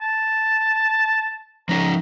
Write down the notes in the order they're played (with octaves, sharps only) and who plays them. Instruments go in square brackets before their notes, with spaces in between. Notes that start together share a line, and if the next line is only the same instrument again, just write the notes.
[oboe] A5
[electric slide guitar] F3 C#4 D#4 [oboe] A#5